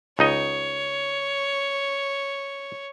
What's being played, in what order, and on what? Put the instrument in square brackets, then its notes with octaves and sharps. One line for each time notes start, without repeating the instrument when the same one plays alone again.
[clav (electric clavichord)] C#2 D#4 D#5 [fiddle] C#5